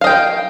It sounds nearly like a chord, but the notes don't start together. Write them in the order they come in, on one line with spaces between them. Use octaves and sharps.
F5 D#5 G5